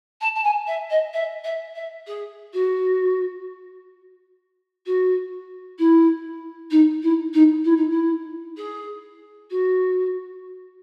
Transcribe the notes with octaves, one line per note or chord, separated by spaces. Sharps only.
A5
A5
G#5
E5
D#5
E5
E5
E5
G#4
F#4
F#4
E4
D#4
E4
D#4
E4
D#4
E4
G#4
F#4